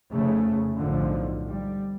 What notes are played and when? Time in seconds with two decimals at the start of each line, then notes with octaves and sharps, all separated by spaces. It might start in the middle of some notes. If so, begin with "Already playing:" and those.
0.11 F1 C#3 A3
0.76 B1 A2 D3 F3
1.49 G3